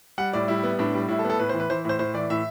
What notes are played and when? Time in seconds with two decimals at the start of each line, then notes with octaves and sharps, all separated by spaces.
0.18 G3 F#5
0.33 A2 D5
0.48 G3 E4
0.63 B3
0.79 A2 D4
0.94 G3
1.08 A2 E4
1.19 A4
1.25 B3
1.30 A4
1.39 A2 B4
1.49 C5
1.54 E3
1.60 B4
1.70 E3 C5
1.85 A2 C5
1.99 A2 C5
2.14 E3 D5
2.30 A2 E5